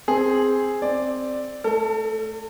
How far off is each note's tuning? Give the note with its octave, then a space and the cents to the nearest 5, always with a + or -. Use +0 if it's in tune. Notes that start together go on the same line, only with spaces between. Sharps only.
C4 +0 G#4 +0
C4 +0 D5 +5
A3 -5 A4 +40